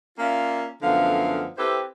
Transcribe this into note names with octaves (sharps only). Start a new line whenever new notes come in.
A#3 C#4 F4 D5 E5 F5
F#2 D3 F3 A3 B3 F5
C4 E4 G4 A4 B4 C5